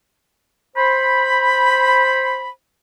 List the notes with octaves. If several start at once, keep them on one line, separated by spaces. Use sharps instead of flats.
C5 B5